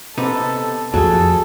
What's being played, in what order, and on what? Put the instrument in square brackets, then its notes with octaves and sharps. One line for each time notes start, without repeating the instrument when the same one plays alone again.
[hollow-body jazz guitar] C3 B3 D#4 [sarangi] A4
[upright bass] F2 [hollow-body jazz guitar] F#3 G#4 [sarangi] A4